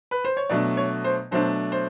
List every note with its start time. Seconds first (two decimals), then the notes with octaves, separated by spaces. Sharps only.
0.11 B4
0.25 C5
0.37 C#5
0.50 B2 F#3 A3 D4 D5
0.77 C#5
1.04 C5
1.31 B2 F#3 A3 D4 C5
1.72 C5